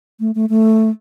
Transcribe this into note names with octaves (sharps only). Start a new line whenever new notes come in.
A3
A3
A3